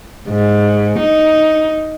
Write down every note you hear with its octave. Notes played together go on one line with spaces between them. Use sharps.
G#2
D#4